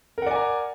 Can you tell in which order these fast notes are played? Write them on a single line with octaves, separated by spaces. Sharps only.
A#4 F#5 D5 G#5 A#5